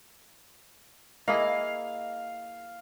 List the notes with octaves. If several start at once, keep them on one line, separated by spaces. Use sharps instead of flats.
A#3 E4 G#4 D#5 F5